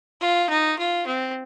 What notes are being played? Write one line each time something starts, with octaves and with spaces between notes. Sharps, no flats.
F4
D#4
F4
C4